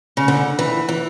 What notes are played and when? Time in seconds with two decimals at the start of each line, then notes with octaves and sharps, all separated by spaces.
0.17 C#3
0.28 D3
0.59 E3
0.89 E3